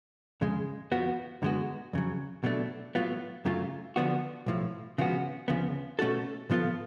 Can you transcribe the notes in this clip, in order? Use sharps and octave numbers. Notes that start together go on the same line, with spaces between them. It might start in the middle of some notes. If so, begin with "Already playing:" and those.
F2 C#3 G#3
F2 F3 B3 F#4
F#2 D3 G#3 B3 F#4
F2 C#3 F#3
B2 F#3 A3 D4
A2 F#3 B3 F4
F#2 C#3 F#3 A3 F4
D3 F3 B3 D4 F#4
B1 A2 F3
C#3 F3 G#3 B3 F#4
D2 C#3 F3 B3
B2 A3 C#4 F#4 A4
A2 F3 B3 F4 A4